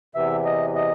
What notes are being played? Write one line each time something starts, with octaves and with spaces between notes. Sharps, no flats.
E2 C3 E3 E5
D#5
D#5